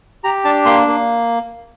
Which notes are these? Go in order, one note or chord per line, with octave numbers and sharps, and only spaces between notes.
G4 A#5
D4 A5
A#3 C6
A#3